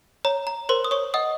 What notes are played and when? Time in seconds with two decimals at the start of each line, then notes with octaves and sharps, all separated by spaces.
0.25 C#5 A#5
0.47 A#5
0.69 A#4 C5 C6
0.85 D#6
0.91 C#5 C#6
1.14 D#5 F#5 D#6